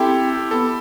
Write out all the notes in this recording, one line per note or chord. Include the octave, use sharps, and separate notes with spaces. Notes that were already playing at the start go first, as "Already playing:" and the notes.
Already playing: C4 E4 G4 A4
B3 A4